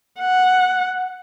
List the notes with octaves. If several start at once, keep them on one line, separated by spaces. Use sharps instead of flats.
F#5